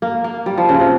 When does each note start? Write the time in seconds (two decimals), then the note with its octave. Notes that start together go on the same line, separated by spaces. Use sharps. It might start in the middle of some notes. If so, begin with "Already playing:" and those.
0.02 A#3
0.24 A#3
0.46 G3
0.58 F3
0.69 C#3
0.80 C3